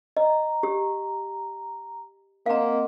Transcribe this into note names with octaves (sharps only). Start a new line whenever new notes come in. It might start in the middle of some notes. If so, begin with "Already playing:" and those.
D#5 A#5
G4
A#3 C4 D#5 F5 F#5 A#5